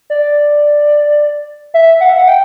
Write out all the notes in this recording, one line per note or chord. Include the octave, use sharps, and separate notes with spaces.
D5
E5
F#5
E5
F#5
G5